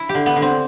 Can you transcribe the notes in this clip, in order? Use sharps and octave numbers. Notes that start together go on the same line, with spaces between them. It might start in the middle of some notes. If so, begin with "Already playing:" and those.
Already playing: E4
G4
D3
B3
D3
C4